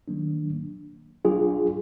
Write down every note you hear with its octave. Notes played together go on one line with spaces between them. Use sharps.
D#3 F#3 A#3 D4
F#3 D4 F4 G#4